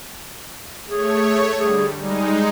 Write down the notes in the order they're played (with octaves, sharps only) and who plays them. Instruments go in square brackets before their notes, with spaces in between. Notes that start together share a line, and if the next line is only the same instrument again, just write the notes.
[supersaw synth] A3 C#5 [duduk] G#4
[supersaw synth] D3 G3 [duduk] G#4
[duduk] G3 [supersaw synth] G#3 D#4